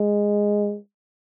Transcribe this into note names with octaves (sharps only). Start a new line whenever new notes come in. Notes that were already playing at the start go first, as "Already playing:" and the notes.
Already playing: G#3